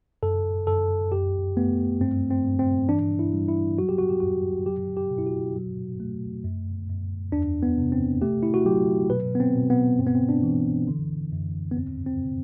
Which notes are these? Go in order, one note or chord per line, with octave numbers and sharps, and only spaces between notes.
F#2 A4
F#2 A4
F#2 G4
A3 B3
G2 C4
C4
G2
C4
E3 D4
E4
G3
E4
F#3 F#4
G4
F#4
G4
F#2 F#4
F#3 G4
G4
B2
E4
F#4
F#3
A3
F#2
F#2
E2 D4
B3
C3
C4
A3 G4
E4
F#4
F#3 G4
B2 B4
B3
C4
B2
B3
G2 C4
B3
C4
D4
E3
D3
F#2
B3
E2 C4
C4
C3